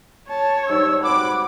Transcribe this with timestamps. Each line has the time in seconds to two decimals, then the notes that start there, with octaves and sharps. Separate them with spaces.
0.29 C#5 A5
0.69 G#2 G3 E6
1.04 B2 C4 F#4 F#5 B5 D6